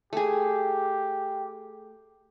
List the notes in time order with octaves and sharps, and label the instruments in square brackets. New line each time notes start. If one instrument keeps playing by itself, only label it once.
[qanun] A3 G#4 [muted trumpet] G4